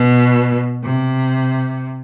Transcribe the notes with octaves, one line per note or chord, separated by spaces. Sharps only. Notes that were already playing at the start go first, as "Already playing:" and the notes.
Already playing: B2
C3